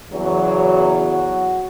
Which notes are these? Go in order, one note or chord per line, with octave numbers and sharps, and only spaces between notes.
E2 C#3 F#3
F#4